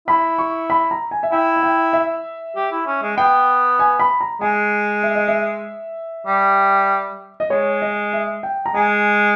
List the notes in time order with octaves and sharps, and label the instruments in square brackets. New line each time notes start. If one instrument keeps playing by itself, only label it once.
[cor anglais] E4 [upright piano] B5
[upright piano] C#6
B5
A#5
G#5
E5
[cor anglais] E4 [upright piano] G5
[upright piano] E5
G5
E5
[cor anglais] G4
E4
C#4
G#3
[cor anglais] B3 [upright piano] G5
[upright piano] G#5
B5
A#5
[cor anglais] G#3 [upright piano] G#5
[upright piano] E5
D#5
E5
[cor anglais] G3
[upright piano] D#5
[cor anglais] G#3 [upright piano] C#5
[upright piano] D#5
E5
G5
A#5
[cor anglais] G#3 [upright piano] G#5